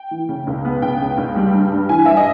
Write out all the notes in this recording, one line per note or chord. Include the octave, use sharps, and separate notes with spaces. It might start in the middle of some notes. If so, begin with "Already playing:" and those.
Already playing: G5
E3
C#3
C#2
B3
C#2 G5
C#3
C#2
G3
G2
G2
E3 G#5
G2 E5
D#5